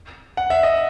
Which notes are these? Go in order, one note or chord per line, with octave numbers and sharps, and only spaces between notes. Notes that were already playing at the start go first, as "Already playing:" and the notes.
F#5
E5
D#5